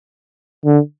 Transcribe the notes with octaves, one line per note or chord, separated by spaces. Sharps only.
D3